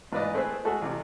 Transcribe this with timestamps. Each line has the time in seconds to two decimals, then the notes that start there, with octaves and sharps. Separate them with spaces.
0.12 A1 G#2 F4 B4 D5 D#5
0.34 A3 C4 G#4 B4 C5
0.65 G#3 A3 F#4 G#4 A4
0.82 A1 C3